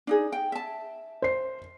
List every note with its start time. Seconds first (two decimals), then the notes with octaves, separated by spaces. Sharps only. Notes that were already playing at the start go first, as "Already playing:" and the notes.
0.07 D4 D#4 G#4
0.32 G5
0.52 E5 A5
1.22 C5 C7